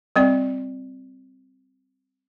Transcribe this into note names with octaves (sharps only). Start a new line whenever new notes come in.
G3 C4 D5